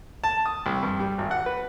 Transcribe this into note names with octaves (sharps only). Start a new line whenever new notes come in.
A5
D#6
C2
G2
G3
G#1
F#5
B4